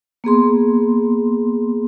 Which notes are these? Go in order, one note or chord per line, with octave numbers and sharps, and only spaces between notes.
A#3 B3 G#4 C6